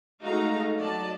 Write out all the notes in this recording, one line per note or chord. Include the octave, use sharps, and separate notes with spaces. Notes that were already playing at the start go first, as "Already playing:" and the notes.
G#3 A3 D#4 F#4 F5 A#5
F#3 D5 D#5 A5